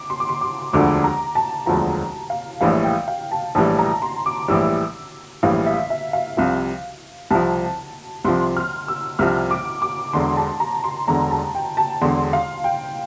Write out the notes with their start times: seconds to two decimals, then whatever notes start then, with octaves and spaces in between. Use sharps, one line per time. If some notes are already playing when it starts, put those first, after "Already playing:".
Already playing: D6
0.10 C6
0.20 D6
0.29 C6
0.41 D6
0.73 E1 D2 D3 F3 D6
1.04 A#5
1.35 A5
1.66 E1 D2 D3 F3 A#5
2.30 F5
2.61 A#1 A2 E3 G3 F5
2.84 G5
3.08 F5
3.31 A5
3.55 A#1 A2 E3 G3 A5
3.79 A#5
4.02 C6
4.26 D6
4.48 A#1 A2 E3 G3 E6
5.43 A#1 A2 E3 G3 F5
5.66 E5
5.90 E5
6.13 F5
6.37 C2 C3 F3
7.30 C2 C3 F3 A5
8.25 C2 C3 F3 C6
8.57 F6
8.88 E6
9.19 C2 C3 F3 F6
9.51 D6
9.82 D6
10.13 E1 E2 D3 C6
10.37 A5
10.60 A#5
10.84 C6
11.07 E1 E2 D3 A#5
11.31 A5
11.55 G5
11.77 A5
12.02 E1 E2 D3 C6
12.33 F5
12.64 G5